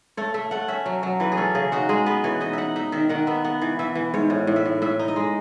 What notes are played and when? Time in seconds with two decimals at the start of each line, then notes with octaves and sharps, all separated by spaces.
0.17 A3 C#5
0.34 A3 E5
0.51 A3 F#5
0.68 C#4 E5
0.86 F#3
1.03 F#3
1.20 E3 B4
1.32 G#4
1.37 C#4 A4
1.55 C#3 G#4
1.72 D#4 F#4
1.89 G#3 G#4
2.06 B3 B4
2.24 E3 C#5
2.41 D#4 D#5
2.53 D#4 E5 F#5
2.76 D#4 E5
2.92 D#3 E5
3.09 D#3 F#5
3.27 B3 E5
3.44 B3 F#5
3.62 E3
3.79 E3 E5
3.95 E3
4.14 G#2 C#5
4.30 A2
4.47 A2
4.56 E5
4.66 A2
4.82 A2 E5
4.99 D#4
5.08 D#5
5.16 G#3